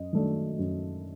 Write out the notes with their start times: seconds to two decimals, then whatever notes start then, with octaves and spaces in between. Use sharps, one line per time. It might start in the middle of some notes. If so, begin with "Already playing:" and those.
Already playing: F#2 D#5
0.13 D#3 F#3 A3 D4
0.59 F#2